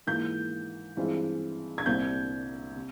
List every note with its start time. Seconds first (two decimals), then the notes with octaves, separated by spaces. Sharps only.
0.07 G#2 E3 A#3 F4 G6
0.97 G2 E3 G#3 C4 F4
1.78 G#6
1.86 C2 A#2 G3 C4 G6
2.76 C3